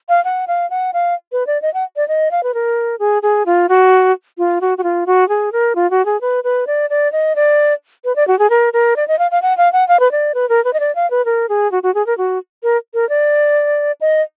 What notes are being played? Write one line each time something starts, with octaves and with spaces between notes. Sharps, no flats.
F5
F#5
F5
F#5
F5
B4
D5
D#5
F#5
D5
D#5
F5
B4
A#4
G#4
G#4
F4
F#4
F4
F#4
F#4
F4
F#4
G#4
A#4
F4
F#4
G#4
B4
B4
D5
D5
D#5
D5
B4
D5
F#4
G#4
A#4
A#4
D5
D#5
F5
F5
F#5
F5
F#5
F5
B4
D5
B4
A#4
B4
D#5
D5
F5
B4
A#4
G#4
F#4
F#4
G#4
A#4
F#4
A#4
A#4
D5
D#5